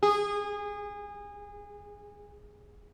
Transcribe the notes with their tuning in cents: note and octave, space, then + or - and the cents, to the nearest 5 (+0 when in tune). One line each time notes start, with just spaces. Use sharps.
G#4 -25